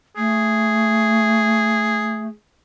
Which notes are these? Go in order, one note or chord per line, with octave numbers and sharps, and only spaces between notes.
A3 G#4